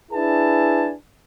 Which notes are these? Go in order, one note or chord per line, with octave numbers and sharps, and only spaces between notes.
D4 E4 G#4 B4 G#5 A5